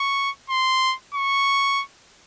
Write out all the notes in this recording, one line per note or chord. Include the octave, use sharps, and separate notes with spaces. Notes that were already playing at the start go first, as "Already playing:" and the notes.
Already playing: C#6
C6
C#6